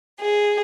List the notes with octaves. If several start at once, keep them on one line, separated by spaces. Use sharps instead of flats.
G#4